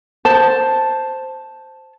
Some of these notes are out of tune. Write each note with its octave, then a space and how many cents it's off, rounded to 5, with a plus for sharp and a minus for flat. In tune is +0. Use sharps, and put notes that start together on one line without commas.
C5 +0 A5 -5